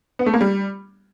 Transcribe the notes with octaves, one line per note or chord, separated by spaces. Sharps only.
B3
A3
A#3
G3